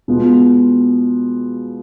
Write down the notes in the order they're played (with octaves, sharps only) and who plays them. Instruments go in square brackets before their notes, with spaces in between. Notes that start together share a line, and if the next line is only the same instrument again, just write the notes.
[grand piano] B2 G#3 B3 F4